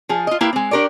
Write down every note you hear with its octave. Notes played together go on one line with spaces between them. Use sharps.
F3 G#4
F4 D#5
A#3 E4 G4 B4 F5 G5
G#3 C4
D4 G4 A#4 C#5 D5